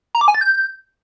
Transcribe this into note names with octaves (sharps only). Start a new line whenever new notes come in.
A#5
D6
G#5
A6
G6